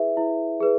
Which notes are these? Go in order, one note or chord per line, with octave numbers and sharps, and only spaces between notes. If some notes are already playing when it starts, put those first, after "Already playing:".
Already playing: E4 G#4 B4 E5
E4
G#4 B4